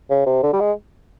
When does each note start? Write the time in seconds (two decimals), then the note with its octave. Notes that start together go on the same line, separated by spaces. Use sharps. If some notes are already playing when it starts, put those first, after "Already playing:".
0.10 C#3
0.26 C3
0.43 D3
0.53 G3
0.60 G#3